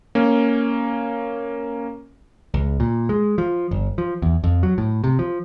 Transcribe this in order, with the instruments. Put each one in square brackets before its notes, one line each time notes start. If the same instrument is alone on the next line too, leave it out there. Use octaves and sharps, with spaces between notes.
[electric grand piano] A#3 C#4
[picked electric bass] C#2
A#2
G#3
F3
G1
F3
E2
F2
F#3
A2
C3
F3